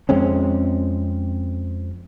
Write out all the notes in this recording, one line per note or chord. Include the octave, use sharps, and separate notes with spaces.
F2 G#3 C4 C#4